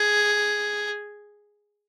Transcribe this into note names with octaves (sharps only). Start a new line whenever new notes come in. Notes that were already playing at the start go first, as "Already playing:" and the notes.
Already playing: G#4